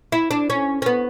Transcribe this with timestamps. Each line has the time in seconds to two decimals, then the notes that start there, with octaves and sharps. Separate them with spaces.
0.12 E4
0.31 D4
0.50 C#4
0.82 C#4
0.86 B3